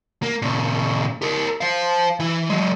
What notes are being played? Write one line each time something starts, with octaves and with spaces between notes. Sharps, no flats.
A#3
A#2 C#3
G4 A#4
C5 F5
E3 E4
F#3 G#3